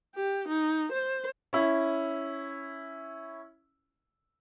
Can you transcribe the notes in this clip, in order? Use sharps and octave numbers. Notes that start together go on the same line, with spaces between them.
G4
D#4
C5
C#4 E4